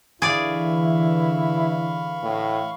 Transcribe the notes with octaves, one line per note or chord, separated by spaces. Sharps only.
D3 E3 E4 G#4 D5 F5 B5 C#6
A2